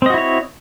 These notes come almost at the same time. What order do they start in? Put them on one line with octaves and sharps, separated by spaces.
C4 D#5 F#4 E4 C#5